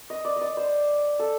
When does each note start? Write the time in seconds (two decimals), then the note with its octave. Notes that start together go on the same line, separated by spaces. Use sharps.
0.10 D#5
0.25 D5
0.36 D#5
0.41 D5
0.57 C5
1.19 A4